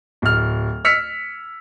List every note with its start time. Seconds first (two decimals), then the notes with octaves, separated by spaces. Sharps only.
0.22 D1 F6
0.85 E6 F6 B6 C#7